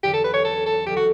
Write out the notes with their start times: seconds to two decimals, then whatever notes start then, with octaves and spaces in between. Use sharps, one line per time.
0.03 E2 D3 F#3 C#4 G4
0.13 A4
0.24 B4
0.34 C#5
0.45 A4
0.66 A4
0.86 D2 D3 F#3 G4
0.97 F#4